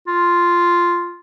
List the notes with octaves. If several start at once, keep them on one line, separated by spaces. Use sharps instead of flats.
F4